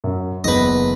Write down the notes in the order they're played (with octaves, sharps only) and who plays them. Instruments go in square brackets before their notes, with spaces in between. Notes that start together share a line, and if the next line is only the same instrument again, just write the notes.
[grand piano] F#2
[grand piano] F#1 E2 [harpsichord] B4 D#5